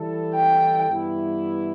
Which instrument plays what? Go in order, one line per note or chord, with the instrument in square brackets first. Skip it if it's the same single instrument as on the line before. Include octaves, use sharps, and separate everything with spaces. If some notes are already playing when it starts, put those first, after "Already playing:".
Already playing: [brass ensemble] E3 G3 E4 A4
[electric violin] G5
[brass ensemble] G2 E3 B3 E4